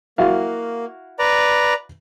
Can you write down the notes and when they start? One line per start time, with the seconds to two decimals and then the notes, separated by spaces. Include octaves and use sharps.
0.18 A#3 E4 F#4 F5
1.19 B4 D5 A#5